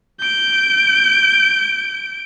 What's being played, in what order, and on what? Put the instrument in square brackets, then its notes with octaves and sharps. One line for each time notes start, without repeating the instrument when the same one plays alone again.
[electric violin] G6 D7